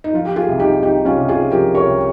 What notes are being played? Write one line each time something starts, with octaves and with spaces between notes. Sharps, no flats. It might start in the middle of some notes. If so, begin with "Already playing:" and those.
D#4
F3 F4
G4
F4 G#4
C2
D#4 G4
C2 D#4 G4
C#4 F4
C3
F4 G#4
F3 G4 A#4
A#4 C#5
C2